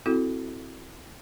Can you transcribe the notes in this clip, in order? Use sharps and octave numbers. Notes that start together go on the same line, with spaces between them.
C4 E4 F#4 A4